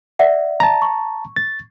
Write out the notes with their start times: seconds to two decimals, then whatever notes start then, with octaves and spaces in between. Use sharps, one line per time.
0.19 D5 E5 F#5
0.60 A5 A#5
0.82 C#6
1.36 A6